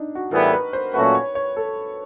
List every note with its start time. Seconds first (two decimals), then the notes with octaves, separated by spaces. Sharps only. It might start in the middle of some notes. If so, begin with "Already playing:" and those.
Already playing: D4 D#4
0.15 F#4
0.31 A2 E3 G3 B3 E4 A#4
0.53 B4
0.73 C5
0.94 A#2 F#3 A3 C#4 F#4 B4
1.15 C#5
1.35 C#5
1.56 A4